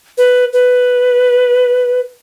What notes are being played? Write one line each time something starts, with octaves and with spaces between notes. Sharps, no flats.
B4
B4